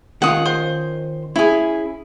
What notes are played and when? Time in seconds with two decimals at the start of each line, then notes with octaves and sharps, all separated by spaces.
0.22 D#3 C#4 F4 F#5 D#6
0.45 C5
1.36 C#4 E4 G#4